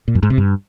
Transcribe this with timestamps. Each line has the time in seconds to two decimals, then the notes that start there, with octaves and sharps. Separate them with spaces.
0.08 A#2
0.15 F#2
0.23 G#2
0.30 C3
0.38 G2